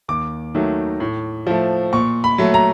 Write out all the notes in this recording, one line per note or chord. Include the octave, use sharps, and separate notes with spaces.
D#2 D6
D#3 F#3 A3
A2
F3 A3
A#2 C#6
B5
F#3 A3
A#5